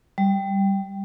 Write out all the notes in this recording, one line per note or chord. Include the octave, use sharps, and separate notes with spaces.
G3